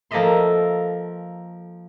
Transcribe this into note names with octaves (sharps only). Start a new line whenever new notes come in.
F3 A#3 A4 D#5 E5 C6